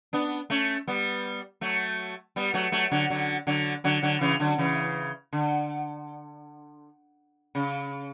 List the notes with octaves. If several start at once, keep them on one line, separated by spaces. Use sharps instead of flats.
B3 D4
A3 C#4
G3 B3
F#3 A3
G3 B3
F#3 A3
F#3 A3
D3 F#3
D3 F#3
D3 F#3
D3 F#3
D3 F#3
C#3 E3
D3 F#3
C#3 E3
D3
C#3